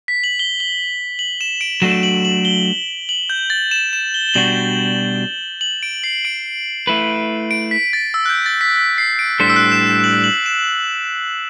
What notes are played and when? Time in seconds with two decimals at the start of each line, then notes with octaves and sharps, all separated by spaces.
0.08 B6
0.24 F#7
0.39 G7
0.60 G7
1.19 F#7
1.41 E7
1.61 D7
1.82 F#3 A3 D4 F#4 A4 E7
2.03 F#7
2.25 F#7
2.45 G7
3.09 F#7
3.30 G6
3.50 A6
3.71 E7
3.93 E7
4.14 G7
4.29 G7
4.34 B2 G3 D4 F#4 F#7
5.61 F#7
5.83 D7
6.04 C7
6.25 D7
6.87 A3 E4 B4
7.51 D7
7.71 B6
7.93 A6
8.14 E6
8.26 F#6
8.29 G6
8.46 A6
8.61 B6
8.76 B6
8.98 C7
9.19 D7
9.40 A2 G3 D4 A4 C5 B6
9.50 E6
9.56 F#6
9.72 E7
9.87 E7
10.04 F#7
10.24 F#7
10.46 E7